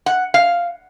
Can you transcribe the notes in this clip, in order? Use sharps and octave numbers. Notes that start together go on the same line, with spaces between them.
F#5
F5